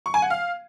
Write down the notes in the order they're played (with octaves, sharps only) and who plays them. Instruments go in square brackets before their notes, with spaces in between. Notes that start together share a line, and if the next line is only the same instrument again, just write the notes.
[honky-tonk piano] C#6
G#5
F#5
F5